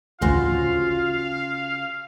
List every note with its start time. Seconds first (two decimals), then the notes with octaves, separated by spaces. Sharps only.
0.21 A1 D2 C#3 F4 F#4 C5 F5